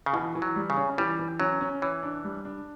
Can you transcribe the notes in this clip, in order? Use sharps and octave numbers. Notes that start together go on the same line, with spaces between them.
C#3
B2 E3
E3
F#3
G3
C#3
C#4
E3 G3
E3
F#3 C#4
C#4
E3 C#5
D4
G3
D4